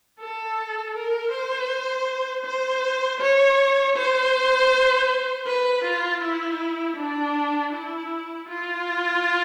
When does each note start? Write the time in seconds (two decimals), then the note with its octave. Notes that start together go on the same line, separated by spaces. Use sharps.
0.19 A4
0.94 A#4
1.31 C5
2.45 C5
3.20 C#5
3.96 C5
5.47 B4
5.84 F4
6.22 E4
6.96 D4
7.73 E4
8.48 F4